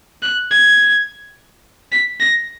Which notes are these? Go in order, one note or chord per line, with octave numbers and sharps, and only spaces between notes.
F#6
G#6
B6
A#6